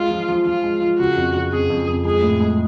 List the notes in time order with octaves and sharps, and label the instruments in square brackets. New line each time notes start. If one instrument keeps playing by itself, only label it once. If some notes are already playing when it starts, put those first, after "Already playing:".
Already playing: [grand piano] G#3 [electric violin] F4
[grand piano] F3
F3
[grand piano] F3 [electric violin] F4
[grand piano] G#3
F3
[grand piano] C#3 [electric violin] F#4
[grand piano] F2
C#3
[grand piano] F2 [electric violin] G#4
[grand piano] F2
F2
[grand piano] G#3 [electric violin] G#4
[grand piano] A2
G#3